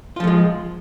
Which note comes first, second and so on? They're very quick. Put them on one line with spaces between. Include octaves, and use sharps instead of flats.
F4 F3 A3 G#3